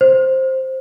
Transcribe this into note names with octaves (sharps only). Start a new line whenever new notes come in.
C5